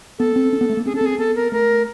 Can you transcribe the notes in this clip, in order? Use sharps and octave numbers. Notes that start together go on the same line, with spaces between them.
B3 A4
C4
C#4
B3
A3
A#3
C4 G#4
C#4 A4
C4 G#4
B3 A4
A#4
A3 A#4